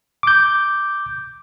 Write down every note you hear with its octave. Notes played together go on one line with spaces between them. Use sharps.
D6 G6